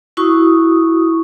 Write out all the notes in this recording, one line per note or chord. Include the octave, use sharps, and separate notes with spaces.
E4 F#4 C#6 D#6